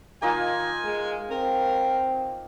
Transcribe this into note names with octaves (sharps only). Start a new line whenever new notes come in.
D#3 A#3 D#4 F4 G#5
G#3
C4 A#4